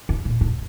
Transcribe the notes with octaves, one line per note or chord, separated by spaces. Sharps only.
C#3
A#2
A2